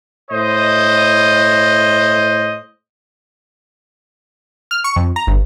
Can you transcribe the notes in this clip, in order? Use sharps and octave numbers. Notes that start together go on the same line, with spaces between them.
A2 C5 D#5
F6
C#6
F2
A#5
G1